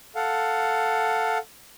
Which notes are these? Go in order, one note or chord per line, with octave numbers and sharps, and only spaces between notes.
A4 F5 F#5